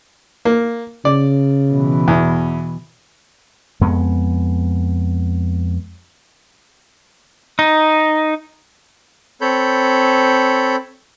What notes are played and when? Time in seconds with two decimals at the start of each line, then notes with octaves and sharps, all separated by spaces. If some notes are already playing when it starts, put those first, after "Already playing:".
0.45 A#3
1.05 C#3 D5
1.71 B2 E3
2.08 E2
3.81 F2 G#3 B3
7.59 D#4
9.41 C4 A4 C#5 B5 G6